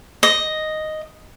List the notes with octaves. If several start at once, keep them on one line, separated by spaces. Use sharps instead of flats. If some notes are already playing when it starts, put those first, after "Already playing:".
D#5